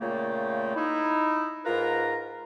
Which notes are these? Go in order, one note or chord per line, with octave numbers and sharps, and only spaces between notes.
A#2 C#3 A3 A#3 F4 G5
D#4 E4
G#2 F4 A#4 B4 A#5